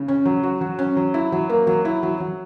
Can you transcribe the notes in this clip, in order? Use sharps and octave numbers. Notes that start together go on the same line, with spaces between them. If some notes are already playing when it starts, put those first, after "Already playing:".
Already playing: C#3
C#4
F#3
F#4
F#3
C#4
F#3
E4
F#3
A#3
F#3
E4
F#3
F#3